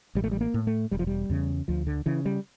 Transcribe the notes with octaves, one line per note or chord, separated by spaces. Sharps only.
A1 G3
A3
G3
A#3
A2
A3
E1 G3
F3
G3
E2 C#3
D2 F3
D3
C#3 E3
G3